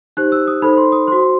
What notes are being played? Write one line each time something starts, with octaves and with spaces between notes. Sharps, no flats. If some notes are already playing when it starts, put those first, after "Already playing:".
D#4 G4 C5 F#6
E6
D#6
D#4 A4 C5 B5
C6
D#6
F#4 C5 C6